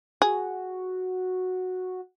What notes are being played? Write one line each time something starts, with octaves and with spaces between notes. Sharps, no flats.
F#4 G#4